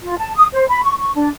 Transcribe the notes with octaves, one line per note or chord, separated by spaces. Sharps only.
F4
A5
D#6
C5
B5
C#6
C#6
D4